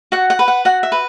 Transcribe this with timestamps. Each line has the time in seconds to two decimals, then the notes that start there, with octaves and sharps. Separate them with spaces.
0.12 F#4 F#5
0.30 F#5
0.39 B4
0.48 F#5
0.65 F#4 F#5
0.83 E5
0.92 B4